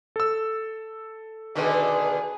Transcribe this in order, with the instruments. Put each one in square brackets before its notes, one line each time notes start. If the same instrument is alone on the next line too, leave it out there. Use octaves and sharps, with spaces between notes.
[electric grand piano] A4 E6
[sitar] B2 D3 D#3 [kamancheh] G#4 B4